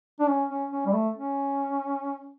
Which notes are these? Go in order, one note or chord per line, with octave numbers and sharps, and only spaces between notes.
D4
C#4
C#4
C#4
G3
A3
C#4